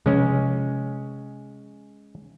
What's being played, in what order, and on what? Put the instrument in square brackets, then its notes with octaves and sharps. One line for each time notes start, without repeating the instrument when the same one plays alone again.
[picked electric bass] C3 F3 [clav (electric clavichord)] G#3 C#4